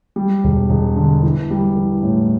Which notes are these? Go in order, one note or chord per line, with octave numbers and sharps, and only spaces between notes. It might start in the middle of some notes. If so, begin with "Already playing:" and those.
G3
E1
E1
D3
E3
G3
E3
A2